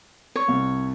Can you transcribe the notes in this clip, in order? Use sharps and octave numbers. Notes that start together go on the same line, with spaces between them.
C#5
C2